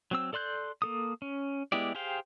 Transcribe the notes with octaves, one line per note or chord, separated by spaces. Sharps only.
F#3 C4 E6
A4 D5 C6 F#6 G6
A#3 A4 D#6
C#4
G#3 B3 E4 G4 D5
G4 G#4 C5 F5 G5